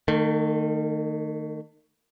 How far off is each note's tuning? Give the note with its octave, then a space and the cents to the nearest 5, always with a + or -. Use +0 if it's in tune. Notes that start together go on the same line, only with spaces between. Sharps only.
D#3 -20 A3 +30